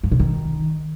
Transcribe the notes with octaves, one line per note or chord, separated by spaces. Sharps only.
G2
B2
D#3